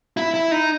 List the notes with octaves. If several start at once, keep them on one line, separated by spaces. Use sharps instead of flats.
E4
E4
D#4